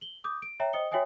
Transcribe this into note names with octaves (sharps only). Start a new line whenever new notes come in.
F#7 G7
D6 D#6 G6
D7
C#5 E5 G5 A#5
C5 D#5 G5 D#6 C#7 G7
F#4 C#5 E5 G5 G#5 D#6